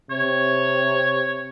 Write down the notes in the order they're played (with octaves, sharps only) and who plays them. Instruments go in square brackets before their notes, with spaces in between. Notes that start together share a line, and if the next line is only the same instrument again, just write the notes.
[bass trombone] C3 [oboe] C#5